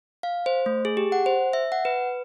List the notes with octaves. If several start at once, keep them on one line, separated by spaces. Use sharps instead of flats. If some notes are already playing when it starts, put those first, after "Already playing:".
F5
C5
A3
G#4
G4
F#5
C5
E5
F#5
B4